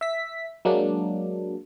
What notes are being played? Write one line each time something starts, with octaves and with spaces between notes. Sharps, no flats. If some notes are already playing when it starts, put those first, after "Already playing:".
E5 B6
F#3 G#3 A#3 D4